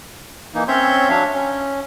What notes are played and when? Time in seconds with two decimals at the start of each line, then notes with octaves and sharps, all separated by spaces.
0.55 E3 A#3 D#4
0.68 C4 C#4 C#5 E5 C6 G6
1.09 F#3 D4 C#5 E5 F5
1.33 C#4